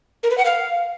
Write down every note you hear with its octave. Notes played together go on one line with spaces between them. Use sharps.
A#4
B4
F#5
F5